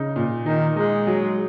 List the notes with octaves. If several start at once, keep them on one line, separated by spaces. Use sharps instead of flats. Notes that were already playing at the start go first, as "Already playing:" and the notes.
Already playing: C#3 D#4
A#2
D#3 D#4
G#3 D#4
F#3